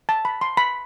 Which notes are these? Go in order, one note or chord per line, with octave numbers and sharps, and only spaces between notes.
A5
B5
C6
B5